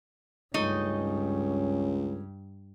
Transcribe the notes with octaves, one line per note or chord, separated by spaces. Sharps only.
C#2 G2 A3 C#4 D#4 D#5